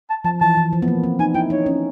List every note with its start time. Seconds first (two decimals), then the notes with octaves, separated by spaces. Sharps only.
0.10 A5
0.24 F3 A5
0.41 E3 A5
0.57 E3
0.73 F3
0.82 B3
0.88 A#3
1.03 C4
1.19 D#4 G#5
1.34 E4 G5
1.50 D#4 C#5
1.66 C#4